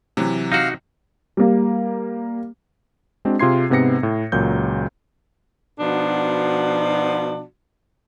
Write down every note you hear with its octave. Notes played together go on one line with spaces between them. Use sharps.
C3 E3 F#3
D#4 F#4 F5
G3 A#3
G#3 C4 D4 F#4
C3 F4 G#4 C6 G#6 C7
G#2 C3 B3 C4 A#6 C#7
A2
C#2 A#2 F#3 G6
B2 F3 B3 D4 D#4 F#4